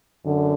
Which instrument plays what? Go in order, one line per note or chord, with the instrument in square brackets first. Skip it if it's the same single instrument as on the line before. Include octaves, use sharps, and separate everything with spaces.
[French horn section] F#2 D3